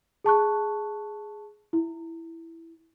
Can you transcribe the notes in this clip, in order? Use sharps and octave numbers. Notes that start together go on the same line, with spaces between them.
G#4 A5 C#6 F#6
E4